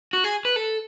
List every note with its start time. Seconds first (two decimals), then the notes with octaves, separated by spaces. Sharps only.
0.13 F#4
0.24 G#4
0.45 B4
0.56 A4